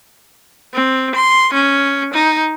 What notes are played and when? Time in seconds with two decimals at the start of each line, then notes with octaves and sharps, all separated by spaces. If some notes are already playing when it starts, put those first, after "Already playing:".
0.74 C4
1.15 C6
1.54 C#4
2.14 D#4